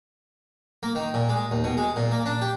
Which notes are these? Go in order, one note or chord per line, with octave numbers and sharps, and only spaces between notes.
A#3
D#3
A#2
G#3
D#2
B2
G#3
A#2
A#3
D4
G4